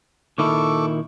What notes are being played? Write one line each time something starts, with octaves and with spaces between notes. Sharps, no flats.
A#2 D#3 E4 A4 C#6 D6